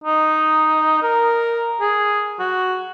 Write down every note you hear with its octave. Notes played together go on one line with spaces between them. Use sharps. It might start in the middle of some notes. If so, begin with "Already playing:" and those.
D#4
A#4
G#4
F#4